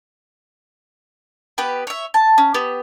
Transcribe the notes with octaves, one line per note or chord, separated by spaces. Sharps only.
B3 G4 B4
C#5 E5
A5
C#4
B3 G4